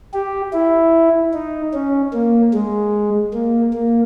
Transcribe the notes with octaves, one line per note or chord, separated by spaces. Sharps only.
G4
E4
D#4
C#4
A#3
G#3
A#3
A#3